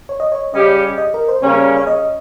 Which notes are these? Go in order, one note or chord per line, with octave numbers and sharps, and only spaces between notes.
C#5
D#5
C#5
C#3 G3 C#4 G4 D#5
D#5
A#4
C5
C#3 G3 A#3 C#4 C#5
C#5
D#5